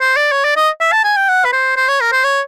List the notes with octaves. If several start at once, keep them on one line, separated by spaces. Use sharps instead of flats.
C5
D5
C#5
D5
D#5
E5
A5
G#5
G5
F#5
B4
C5
C5
C#5
A#4
C5
C#5